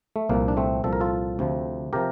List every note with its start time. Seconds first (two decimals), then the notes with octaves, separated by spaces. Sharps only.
0.16 A3
0.29 C2 A#2 F3 A#3
0.48 D4
0.57 A3 C4
0.84 C2 A#2 F3 A4
0.93 A#4
1.00 F4 A4
1.39 D2 C3 F3
1.93 C3 F3 G4 A#4